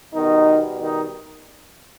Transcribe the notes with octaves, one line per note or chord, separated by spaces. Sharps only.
B2 D#3 G3 B3 D#4
D#3 D#4